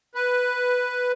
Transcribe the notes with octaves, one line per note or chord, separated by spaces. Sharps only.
B4